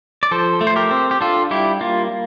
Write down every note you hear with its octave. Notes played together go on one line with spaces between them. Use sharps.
D5
F3 A4 C5
A3
C5
G4 A#4
C4
G4
D4 F4 A4
G3 E4 G4
A#3 F4